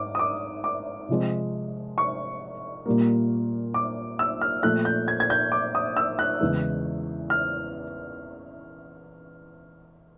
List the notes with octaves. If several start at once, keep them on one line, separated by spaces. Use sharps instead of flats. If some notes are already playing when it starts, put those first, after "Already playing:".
Already playing: G#2 D6
D#6
D6
D6
C3 F3 G#3
C#6
A#2 G3 A#3
D6
E6
F6
A#2 F3 A3 F#6
G6
G#6
G#6
G6
D6
D#6
E6
F#6
E2 C#3 E3 G#3
F6